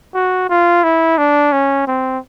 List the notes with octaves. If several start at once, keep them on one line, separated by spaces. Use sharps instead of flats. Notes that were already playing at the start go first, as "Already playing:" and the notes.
F#4
F4
E4
D4
C#4
C4